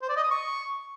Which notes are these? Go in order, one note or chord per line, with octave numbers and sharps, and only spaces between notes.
C5
D5
D#5
D#6
C#6